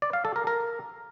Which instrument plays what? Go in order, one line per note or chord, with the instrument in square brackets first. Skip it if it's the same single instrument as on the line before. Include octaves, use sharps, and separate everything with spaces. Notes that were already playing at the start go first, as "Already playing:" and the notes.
[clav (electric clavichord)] D5
F5
A4
A#4
A#4